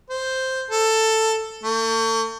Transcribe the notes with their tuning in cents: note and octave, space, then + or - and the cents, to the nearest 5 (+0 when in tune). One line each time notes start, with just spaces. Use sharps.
C5 +0
A4 +10
A3 +40